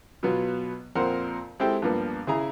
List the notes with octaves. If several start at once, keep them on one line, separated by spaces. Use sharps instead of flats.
B2 F#3 B3 F4
F2 A#2 C4 A#4 C5 F#5
G#3 C4 E4 G4 A4 G5
G2 F3 A#3 B3
C#3 E4 G#4 A#5